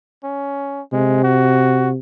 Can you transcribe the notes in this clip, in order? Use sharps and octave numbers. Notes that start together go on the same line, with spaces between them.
C#4
C3 G#3
F#4